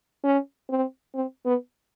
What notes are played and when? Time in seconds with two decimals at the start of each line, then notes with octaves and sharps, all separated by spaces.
0.24 C#4
0.69 C4
1.15 C4
1.45 B3